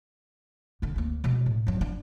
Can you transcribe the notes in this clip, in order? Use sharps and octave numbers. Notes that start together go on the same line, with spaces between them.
A#1 D3
D2 A#3
B2 G#3
A2
G2 F#3
D4